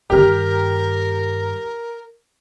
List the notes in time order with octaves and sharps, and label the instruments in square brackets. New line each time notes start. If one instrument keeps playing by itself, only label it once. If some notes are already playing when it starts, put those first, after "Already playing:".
[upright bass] G2 D#3 [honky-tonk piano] G4 F6 [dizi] A#4